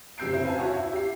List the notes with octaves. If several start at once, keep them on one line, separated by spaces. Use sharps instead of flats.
F#1 C3 E6 G6 C7 D7
C4 E4 C5
B4 F5 G#5 A5
F#4 C#5 E5
E4
G4 C7